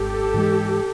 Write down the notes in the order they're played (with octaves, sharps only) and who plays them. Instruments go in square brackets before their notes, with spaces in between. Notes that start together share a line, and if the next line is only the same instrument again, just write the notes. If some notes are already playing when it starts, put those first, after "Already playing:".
Already playing: [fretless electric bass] G#1 [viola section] G4 A4
[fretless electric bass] G#2 E3 G#3